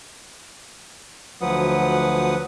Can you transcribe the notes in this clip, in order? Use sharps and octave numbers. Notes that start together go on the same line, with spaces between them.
D2 F3 F#3 B4 F#5 D#6